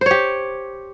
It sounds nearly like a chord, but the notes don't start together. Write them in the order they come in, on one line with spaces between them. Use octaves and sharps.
C5 C#5 G4